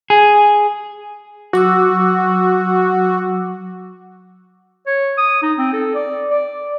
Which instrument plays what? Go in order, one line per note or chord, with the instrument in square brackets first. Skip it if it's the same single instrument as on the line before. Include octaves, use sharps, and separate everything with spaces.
[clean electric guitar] G#4
[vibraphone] F#3 D6 E6 [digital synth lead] F#4
[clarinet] C#5
D#6
D#4
C4
A4
D5
D5